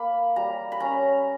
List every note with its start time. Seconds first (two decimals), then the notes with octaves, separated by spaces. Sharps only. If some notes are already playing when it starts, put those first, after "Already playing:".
Already playing: A#3 B5
0.36 G3 A#5
0.72 B5
0.80 C#4 A#5